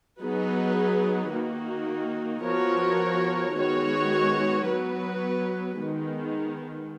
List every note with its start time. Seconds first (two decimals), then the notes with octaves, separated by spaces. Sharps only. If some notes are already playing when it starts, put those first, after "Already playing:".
0.20 F#3 B3 D#4 G#4 B4
1.31 D#3 A#3 D#4 F#4
2.43 F3 B3 F#4 A#4 C#5
3.54 D#3 G#3 B3 F#4 C#5
4.66 F#3 B3 F#4 B4
5.77 D#3 G#3 B3